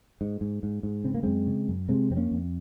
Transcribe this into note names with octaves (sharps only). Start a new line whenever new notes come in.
G#2
G#2
G#2
G#2
C#3 C4
A#3
F#2 G#3 C4
C#3
F#2
C3 G#3 C4
F2 C4
A#3 C#4
F2